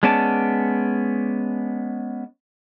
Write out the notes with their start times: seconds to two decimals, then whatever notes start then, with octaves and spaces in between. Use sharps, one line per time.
0.03 G#3 B3 C#4 D5 A5